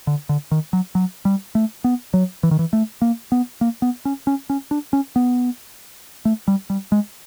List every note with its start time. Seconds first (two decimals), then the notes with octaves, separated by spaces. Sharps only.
0.07 D3
0.29 D3
0.51 D#3
0.73 F#3
0.95 F#3
1.25 G3
1.55 A3
1.84 B3
2.14 F#3
2.43 E3
2.51 D#3
2.59 E3
2.73 A3
3.02 A#3
3.32 B3
3.61 A#3
3.82 B3
4.05 C#4
4.27 C#4
4.50 C#4
4.71 D4
4.93 C#4
5.16 B3
6.25 A3
6.48 G3
6.70 G3
6.92 G#3